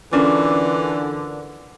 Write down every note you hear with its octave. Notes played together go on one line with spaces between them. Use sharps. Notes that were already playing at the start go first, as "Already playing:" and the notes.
D3 E3 C#4 D4 F4 A#4 D5 D6